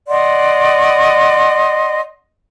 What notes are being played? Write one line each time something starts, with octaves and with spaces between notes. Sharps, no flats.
D5 D#5 F#5 C6